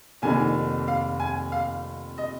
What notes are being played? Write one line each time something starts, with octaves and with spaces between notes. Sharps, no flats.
F1 F2 D#3 A#3 D#4 G#5
F5
G#5
F5
D#5